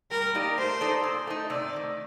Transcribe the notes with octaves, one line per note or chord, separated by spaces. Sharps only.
G3 A#4
A#3 D#4 G4 D5
A3 C5
D#4 A4 D5
A#2
A3 D#4
C3 D5
D#3 A3